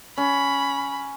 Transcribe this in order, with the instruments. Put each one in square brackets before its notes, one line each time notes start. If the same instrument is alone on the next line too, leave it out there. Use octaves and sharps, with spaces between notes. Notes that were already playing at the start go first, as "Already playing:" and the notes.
[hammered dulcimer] C#4 [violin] B5